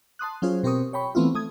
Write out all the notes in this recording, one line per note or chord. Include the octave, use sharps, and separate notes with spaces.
A5 C6 D#6 F#6
F#3 C#4 F4 G#4 C5
B2 C4 G4 A#4 C#6 D#6
C#5 G5 B5 C#6
E3 A3 B3 C4 E4 F4
A3 D#6 G#6